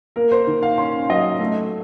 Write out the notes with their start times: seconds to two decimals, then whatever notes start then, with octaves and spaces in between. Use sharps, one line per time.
0.16 A#3 A#4
0.32 C5
0.47 D#3
0.63 F5
0.78 C#4 C6
1.10 F#3 D#5
1.40 A3